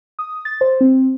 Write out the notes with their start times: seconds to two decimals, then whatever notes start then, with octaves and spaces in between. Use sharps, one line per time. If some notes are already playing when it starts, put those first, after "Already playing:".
0.19 D#6
0.45 A6
0.61 C5
0.81 C4